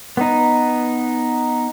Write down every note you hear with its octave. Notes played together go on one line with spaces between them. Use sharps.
B3 D#4